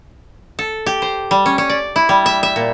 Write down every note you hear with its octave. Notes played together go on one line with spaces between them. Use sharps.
A4
G4
C5
G3
C#4
C#4
D5
E4
G3
E5
E5
A#2